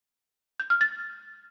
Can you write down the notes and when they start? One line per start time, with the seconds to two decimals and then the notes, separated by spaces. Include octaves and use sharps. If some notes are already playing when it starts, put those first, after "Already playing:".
0.60 G6
0.70 F6
0.81 A6